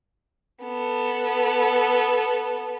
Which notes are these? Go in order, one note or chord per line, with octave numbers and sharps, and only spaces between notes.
B3 A4